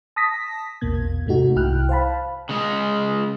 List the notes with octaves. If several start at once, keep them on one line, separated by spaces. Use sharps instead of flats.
A5 D#6 A#6 B6
A#1 E2 B2 A#3 G#6
G#2 C3 A3 D#4 F#4
C2 E4 G5 F6 F#6
C5 F5 A5 B5
C#3 G#3